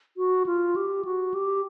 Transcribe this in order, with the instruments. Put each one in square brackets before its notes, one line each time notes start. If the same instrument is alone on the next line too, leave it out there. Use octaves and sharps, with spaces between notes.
[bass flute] F#4
F4
G4
F#4
G4